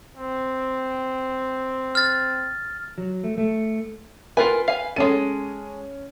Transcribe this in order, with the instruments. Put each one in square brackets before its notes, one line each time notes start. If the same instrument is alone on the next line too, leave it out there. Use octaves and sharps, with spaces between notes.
[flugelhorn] C4
[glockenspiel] F6 A6
[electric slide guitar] F#3
A3
A3
[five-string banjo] F4 A#4 G#5 [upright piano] B4
[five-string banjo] F5 G#5
[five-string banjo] G#3 A4 [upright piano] C#4 D#7